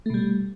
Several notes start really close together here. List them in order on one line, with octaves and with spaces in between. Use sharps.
A3 B2 G3